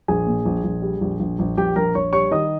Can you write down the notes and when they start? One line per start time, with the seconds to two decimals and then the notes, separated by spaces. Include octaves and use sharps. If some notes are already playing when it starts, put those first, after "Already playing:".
0.08 A#1 G#4 G#5
0.27 A#2
0.45 A#1
0.64 A#1
0.82 G3
1.01 A#1
1.20 A#1
1.39 A#1
1.57 A#1 G4 G5
1.76 A#1 A#4 A#5
1.95 A#1 C#5 C#6
2.13 G3 C#5 C#6
2.31 D#3 D#5 D#6